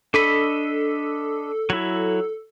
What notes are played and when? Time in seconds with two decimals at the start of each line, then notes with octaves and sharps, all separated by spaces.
0.14 D4 A4 D#5 B5
1.70 F#3 E4